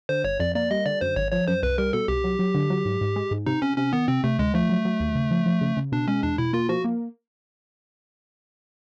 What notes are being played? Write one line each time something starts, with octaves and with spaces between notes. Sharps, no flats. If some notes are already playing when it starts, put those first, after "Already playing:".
D3 C5
G1 C#5
F2 D5
A#3 D5
G3 D#5
D3 D5
F#2 C5
G#1 C#5
F3 C#5
F#2 C5
C2 B4
G3 A#4
B2 A4
C2 G4
F#3
F#3
D3
F#3
G#2
G#2
G#3
G#2
C3 D#4
C3 C#4
C3 C#4
D#3 B3
C3 C4
C3 A3
D2 G#3
F3 A3
F#3
F#3
D#2
C#3
F3
F3
C#3
C#3
B2 D4
G#3 C#4
E2 D4
B2 E4
A#3 F4
F3 F#4
A#3